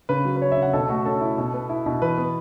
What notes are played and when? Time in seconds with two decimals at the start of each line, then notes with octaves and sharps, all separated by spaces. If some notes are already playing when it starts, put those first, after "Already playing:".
0.09 C#3 B4
0.25 F#3
0.36 B4
0.42 C#4 C#5
0.52 E5
0.57 C#3 F#5
0.73 B2 A4
0.89 A3 F#4
1.05 C#4 A4
1.21 E4
1.38 B2
1.54 B3
1.69 E4
1.86 B2
2.02 E3 B4
2.18 B3